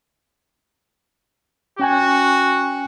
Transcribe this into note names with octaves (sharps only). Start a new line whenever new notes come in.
C#4 F#4 G5 G#5